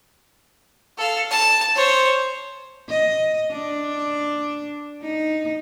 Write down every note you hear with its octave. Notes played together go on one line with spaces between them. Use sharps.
A4 F5
A5
C5 C#5
D#5
D4
D#4